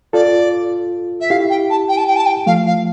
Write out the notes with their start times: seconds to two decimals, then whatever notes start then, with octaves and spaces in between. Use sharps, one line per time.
0.13 F4 A4 D5
1.20 E5
1.30 E4 G4 F5
1.49 G5
1.69 A5
1.88 G5
1.97 A5
2.07 G5
2.16 A5
2.26 G5
2.46 F3 A3 F5
2.66 F5